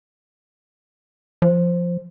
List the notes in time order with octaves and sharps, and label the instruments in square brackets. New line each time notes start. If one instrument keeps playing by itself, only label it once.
[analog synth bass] F3 [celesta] C5